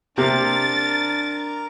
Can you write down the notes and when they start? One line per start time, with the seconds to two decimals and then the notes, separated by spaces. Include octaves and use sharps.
0.18 C3 D4 A#4 A6